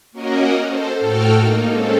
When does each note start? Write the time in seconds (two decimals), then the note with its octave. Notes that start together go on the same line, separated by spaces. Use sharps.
0.12 A#3 C#4 F#4 A#4 D#5
0.64 A4 C5
1.00 A2 F#4 A4 G5 F6
1.35 A#3 D#4
1.67 G#3 C4 C#4 A4